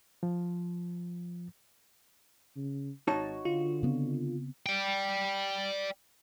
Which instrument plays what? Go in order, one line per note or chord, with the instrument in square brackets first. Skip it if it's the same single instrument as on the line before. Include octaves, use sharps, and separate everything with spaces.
[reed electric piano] F3
[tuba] C#3
[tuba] G#1 [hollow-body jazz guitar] D#4 F#4 C#5 [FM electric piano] A5
[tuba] D3 [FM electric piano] F4
[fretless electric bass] C#3 B3 C4
[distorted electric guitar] D5 G5